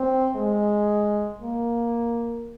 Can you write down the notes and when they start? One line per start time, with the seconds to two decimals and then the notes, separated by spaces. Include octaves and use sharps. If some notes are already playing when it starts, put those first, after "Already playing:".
Already playing: C4
0.36 G#3
1.42 A#3